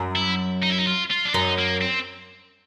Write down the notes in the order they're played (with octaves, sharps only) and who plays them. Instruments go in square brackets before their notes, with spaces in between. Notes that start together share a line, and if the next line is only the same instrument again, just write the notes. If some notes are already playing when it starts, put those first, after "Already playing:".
Already playing: [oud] F#2
[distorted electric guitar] E4
D#4
E4
D#4
F4
F4
D4
[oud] F#2 [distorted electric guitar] D#4
[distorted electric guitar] A#3
C4